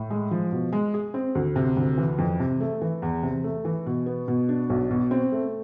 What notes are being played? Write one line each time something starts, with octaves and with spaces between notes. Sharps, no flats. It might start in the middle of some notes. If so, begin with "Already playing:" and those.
Already playing: A2
G#3
F3
B2
G#3
G#4
C4
D2
C3
D2
E3
F2
C3
A3
E3
E2
C3
A3
E3
B2
B3
B2
D4
B1
B2
C4
A3